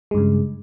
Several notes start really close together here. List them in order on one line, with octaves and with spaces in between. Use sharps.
G#3 G2 C#3